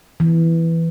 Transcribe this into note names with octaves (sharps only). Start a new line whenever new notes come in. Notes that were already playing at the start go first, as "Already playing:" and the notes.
E3